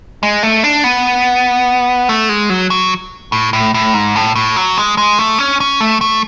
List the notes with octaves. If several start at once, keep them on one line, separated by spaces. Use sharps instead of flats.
G#3
A3
D4
B3
A3
G#3
F#3
F#3
A2
A2
A2
G#2
A2
A2
F#3
G#3
G#3
A3
C#4
C#4
A3
A3